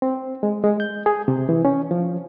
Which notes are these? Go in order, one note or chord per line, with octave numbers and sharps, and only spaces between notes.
C4
G#3
G#3
G6
G#4
C3
E3
C#4
F3